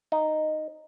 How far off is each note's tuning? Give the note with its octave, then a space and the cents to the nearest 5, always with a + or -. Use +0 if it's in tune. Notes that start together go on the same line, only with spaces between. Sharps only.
D#4 -5